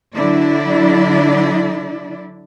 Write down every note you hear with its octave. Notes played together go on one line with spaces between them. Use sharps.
D3 F#3 D4 E4 D5